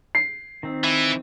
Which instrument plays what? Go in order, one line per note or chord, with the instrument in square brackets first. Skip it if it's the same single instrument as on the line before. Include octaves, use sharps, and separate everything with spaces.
[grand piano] C7
[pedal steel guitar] D#3 C4
[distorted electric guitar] E3